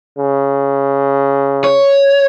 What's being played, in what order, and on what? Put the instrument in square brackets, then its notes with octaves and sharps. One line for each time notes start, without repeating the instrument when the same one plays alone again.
[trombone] C#3
[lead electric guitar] C#5